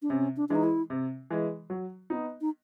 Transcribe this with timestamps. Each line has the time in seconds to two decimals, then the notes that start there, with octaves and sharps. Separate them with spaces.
0.02 D4
0.10 C3 C#4
0.37 D4
0.49 E3 G#3 D4
0.55 D#4
0.63 E4
0.90 C3
1.30 E3 G#3
1.70 F#3
2.10 B3 D#4
2.41 D#4